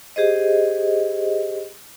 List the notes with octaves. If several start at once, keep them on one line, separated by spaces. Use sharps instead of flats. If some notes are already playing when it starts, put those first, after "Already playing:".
G4 G#4 C5 D#5